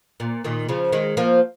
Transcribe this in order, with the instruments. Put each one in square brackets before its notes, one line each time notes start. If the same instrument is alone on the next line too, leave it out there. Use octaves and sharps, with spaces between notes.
[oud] A#2
A#2 D#3
C#3 F3
D#3 G#3
F3 A#3